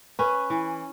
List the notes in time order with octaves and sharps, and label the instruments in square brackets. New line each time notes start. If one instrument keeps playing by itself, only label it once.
[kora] C#4 [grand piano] B4
[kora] E3